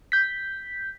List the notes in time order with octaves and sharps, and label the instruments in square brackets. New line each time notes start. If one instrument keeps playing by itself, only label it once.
[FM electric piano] G6 B6